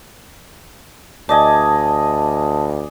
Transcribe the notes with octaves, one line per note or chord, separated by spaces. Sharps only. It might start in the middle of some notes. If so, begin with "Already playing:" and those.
D2 D5 D#5 G#5 A5